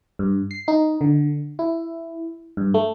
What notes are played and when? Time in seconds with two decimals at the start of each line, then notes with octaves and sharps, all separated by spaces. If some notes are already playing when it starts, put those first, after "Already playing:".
0.19 G2
0.51 C7
0.68 D#4
1.01 D3
1.59 E4
2.57 G2
2.74 A3